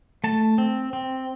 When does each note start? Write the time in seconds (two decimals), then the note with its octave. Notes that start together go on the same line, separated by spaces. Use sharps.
0.24 A3 A5
0.58 C4
0.93 C4